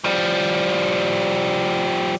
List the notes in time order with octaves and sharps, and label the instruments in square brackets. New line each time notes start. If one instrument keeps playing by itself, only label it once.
[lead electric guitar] F3 G3